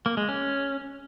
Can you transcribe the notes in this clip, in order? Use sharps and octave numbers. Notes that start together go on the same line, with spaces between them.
A#3
G#3
C#4